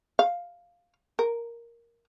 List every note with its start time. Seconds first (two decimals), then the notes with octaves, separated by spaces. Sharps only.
0.19 F5
1.19 A#4